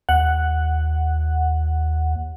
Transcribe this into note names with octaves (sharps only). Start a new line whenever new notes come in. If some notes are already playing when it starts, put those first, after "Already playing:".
D#2 F#5